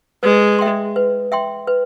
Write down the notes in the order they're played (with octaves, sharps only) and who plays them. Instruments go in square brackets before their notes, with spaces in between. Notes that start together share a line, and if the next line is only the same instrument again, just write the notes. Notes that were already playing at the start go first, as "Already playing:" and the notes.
[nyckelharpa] G#3 [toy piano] B4
[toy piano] E5 G5 C6
B4
E5 G5 C6
B4